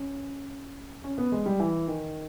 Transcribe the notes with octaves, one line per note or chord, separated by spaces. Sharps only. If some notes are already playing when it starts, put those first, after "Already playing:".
Already playing: C#4
C#4
B3
G#3
G3
E3
D#3